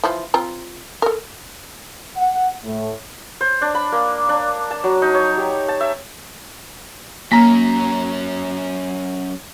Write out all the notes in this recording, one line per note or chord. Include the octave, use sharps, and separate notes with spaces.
E3 F3 F4
C4 F4 A#5
A4 A#4
F#5
A2
C5
D4
B5
A#3
D4
A5
F#3
D#4
C#5
G4
A5
E5
F#3 A#3 C#4 A#5 B6